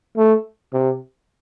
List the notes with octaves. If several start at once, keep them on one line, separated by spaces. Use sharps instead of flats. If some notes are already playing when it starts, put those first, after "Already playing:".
A3
C3